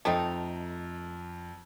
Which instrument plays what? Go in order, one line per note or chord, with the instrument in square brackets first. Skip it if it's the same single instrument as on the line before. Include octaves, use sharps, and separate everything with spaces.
[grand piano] F2 F3 [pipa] A3 C4 D#4